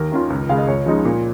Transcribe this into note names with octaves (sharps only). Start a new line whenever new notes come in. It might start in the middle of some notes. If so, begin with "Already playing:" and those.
Already playing: D#2 A#4
D#3 C#4 F4
C#2
C#3 G#3 F5
D#5
C#2 C#5
C#3 F3 G#3 D#4
A#2